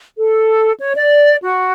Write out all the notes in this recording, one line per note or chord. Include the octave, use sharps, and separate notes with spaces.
A4
C#5
D5
F#4